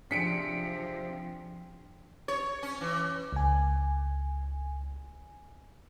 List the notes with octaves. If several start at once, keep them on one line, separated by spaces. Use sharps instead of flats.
C3 F3 C4 D4 G#4 B6 C#7 D7
C#5
C#4
E3
C#2 G#5